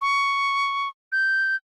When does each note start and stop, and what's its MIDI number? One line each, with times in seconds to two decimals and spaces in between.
0.02 0.89 85
1.12 1.56 91